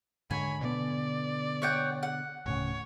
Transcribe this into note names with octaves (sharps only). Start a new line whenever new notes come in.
G#2 D3 C#5 G#5 B5
B2 D3 B3 D5
C#5 F#5 G5
F#5
D1 A2 C#3 C#5